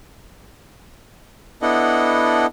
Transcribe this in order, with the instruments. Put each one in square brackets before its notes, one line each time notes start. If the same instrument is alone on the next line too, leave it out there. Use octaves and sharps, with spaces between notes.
[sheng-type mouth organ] B3 D4 E4 A4 D#5 F#5